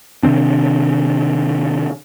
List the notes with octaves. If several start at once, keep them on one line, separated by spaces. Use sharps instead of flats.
C3 D#3 C4 D4